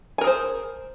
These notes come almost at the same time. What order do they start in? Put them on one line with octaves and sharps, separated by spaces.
G#5 A#4 G#4 C5